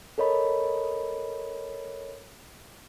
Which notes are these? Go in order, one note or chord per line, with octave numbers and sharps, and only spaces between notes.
A4 A#4 C#5 D#5 B5